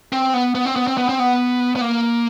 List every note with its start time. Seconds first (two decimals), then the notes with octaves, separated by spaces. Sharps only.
0.12 C4
0.34 B3
0.55 B3
0.65 C4
0.76 B3
0.87 C4
0.97 B3
1.09 C4
1.19 B3
1.76 B3
1.81 A#3